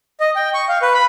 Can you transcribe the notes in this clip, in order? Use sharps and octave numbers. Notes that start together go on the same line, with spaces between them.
D#5
G5
C#6
F5
B4
B5